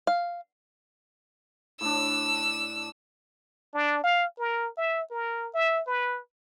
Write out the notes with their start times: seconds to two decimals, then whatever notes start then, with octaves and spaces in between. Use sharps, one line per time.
0.07 F5
1.81 A2 D4 E6
3.74 D4
4.04 F5
4.39 A#4
4.77 E5
5.11 A#4
5.54 E5
5.87 B4